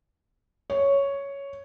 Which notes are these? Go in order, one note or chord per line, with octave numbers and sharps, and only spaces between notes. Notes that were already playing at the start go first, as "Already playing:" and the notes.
C#5